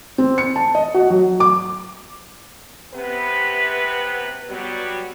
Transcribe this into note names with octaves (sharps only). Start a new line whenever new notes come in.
C4
C#7
A5
D#5
F#4
F#3
D6
C3 B3 B4
F#3 G3 B3